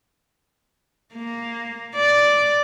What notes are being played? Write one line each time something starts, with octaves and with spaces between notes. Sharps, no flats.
A#3
D5